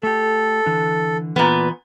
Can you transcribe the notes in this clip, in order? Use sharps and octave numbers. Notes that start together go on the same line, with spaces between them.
A3 G4 A4
D3 E3
A#2 E3 B3 B4